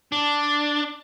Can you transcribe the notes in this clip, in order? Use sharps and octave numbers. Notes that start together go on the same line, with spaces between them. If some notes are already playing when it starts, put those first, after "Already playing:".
D4